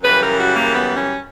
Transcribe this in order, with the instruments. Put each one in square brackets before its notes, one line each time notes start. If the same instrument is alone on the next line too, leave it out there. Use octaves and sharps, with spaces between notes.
[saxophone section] F#2 C#3 E3 G3 B4
A#4
F#4
A#3
B3
C#4